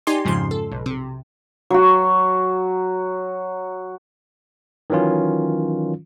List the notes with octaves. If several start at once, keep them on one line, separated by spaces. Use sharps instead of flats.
D#4 G4 D5 G#5 C6
F2 G#2 C#3 F3 C6
A4
B1
C3
F#3 F#4
D#3 E3 F#3 C#4 F4